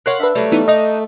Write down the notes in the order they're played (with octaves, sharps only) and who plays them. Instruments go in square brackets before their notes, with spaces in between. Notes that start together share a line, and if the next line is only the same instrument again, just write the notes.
[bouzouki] A#4 F5 F#5 [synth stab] C#5 C6 F#6
[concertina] D4 [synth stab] B4 E5
[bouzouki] F#3 G3 [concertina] A3
[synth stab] E3 B3 D#4
[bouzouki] D4 D#4 [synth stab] D#5